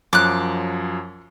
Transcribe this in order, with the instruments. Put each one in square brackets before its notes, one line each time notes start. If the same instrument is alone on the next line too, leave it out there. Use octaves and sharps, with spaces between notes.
[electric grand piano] F#2 F3 F#3 [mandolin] D6 F#6